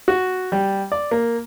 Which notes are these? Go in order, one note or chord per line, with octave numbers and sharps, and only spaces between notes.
F#4
G3
D5
A#3